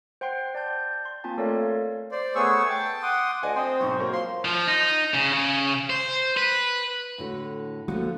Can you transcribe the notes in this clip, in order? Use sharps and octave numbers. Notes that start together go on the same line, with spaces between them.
C5 F#5 G5 C6 C7
D5 A5 G6
C6
A#3 C4 F4 G#5 A5
A3 A4 A#4 C#5 D5 F5
C5 D5
A3 B3 G#4 C#5 C#6 E6
G5 A5
F#5 C6 D6 D#6
D2 D#5 F#5 G#5
C4 C5 D#6
B1 G#2 C#6
F#3 A#3 C5
F3 C6
F3
D#4
C#3
C#3
C5
B4
A2 D3 F#4
D3 F3 A#3 F#4